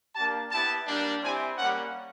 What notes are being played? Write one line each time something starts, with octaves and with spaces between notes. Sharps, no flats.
A#3 D4 G4 A5
B3 E4 G4 A5
G3 A#3 D4
C4 E4 G4 G#5
G3 A#3 C#4 F#5